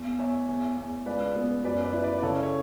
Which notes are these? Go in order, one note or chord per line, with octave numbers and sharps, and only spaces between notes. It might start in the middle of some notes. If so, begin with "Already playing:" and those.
Already playing: E2
E2 C#5 E5
E2
E2
C#2 B4 D5
B3
F#2 B4 D5
B4 D5
E4
B4 D5
D5
C#3 A4 C#5
C#5